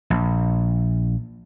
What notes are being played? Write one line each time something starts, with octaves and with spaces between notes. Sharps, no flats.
A#1